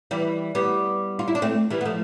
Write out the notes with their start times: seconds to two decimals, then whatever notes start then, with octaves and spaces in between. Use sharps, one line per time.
0.11 E3 G3
0.55 G3 B3
1.19 F4
1.28 E4
1.35 D4
1.42 A3 C4
1.70 E3 G3
1.81 B3
1.85 F3 A3